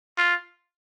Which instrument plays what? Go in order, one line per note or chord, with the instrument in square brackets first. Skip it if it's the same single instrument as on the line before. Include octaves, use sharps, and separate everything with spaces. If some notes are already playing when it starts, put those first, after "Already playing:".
[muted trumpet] F4